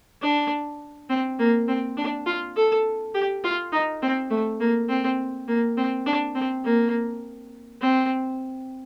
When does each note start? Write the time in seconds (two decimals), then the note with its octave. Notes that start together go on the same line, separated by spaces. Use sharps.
0.23 D4
1.09 C4
1.39 A#3
1.68 C4
1.97 D4
2.26 F4
2.56 A4
3.14 G4
3.44 F4
3.72 D#4
4.02 C4
4.30 A3
4.60 A#3
4.89 C4
5.48 A#3
5.77 C4
6.06 D4
6.35 C4
6.64 A#3
7.81 C4